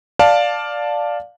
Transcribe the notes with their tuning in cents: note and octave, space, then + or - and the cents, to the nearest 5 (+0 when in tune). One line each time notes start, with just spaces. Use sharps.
D5 +0 F5 +10 A5 +0